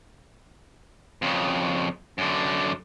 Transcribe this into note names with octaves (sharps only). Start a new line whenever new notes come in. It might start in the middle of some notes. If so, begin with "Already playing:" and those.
F2 C#3
F#2 D3